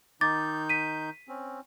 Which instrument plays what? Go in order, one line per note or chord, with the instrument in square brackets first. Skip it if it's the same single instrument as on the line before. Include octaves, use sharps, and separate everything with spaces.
[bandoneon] D#3 D#4 G6 [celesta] D6 A6
[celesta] B6 D#7
[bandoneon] C4 C#4